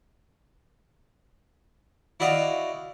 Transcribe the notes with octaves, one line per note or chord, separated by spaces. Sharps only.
E4 F#4 D5 D#5 F5